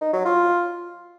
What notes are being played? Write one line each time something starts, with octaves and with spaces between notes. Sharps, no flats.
D#4
F#3
F4